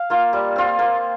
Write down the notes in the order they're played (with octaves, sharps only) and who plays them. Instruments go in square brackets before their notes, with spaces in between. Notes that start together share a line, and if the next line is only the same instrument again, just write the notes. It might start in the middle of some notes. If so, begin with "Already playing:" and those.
Already playing: [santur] F5
A#3 F4
G3
C4 F4
A#3 C5